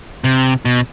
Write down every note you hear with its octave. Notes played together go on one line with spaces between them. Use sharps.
C3
B2